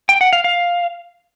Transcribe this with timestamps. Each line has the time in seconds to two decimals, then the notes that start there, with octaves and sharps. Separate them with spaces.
0.09 G5
0.21 F#5
0.33 F5
0.44 F5